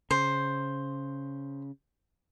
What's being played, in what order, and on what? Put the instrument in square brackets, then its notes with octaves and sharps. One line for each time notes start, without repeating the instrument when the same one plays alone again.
[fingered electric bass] C#3 [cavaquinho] C5